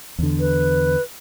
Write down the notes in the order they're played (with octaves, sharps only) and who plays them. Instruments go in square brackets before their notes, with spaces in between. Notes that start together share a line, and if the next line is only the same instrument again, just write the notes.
[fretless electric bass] E2 D3
[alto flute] B4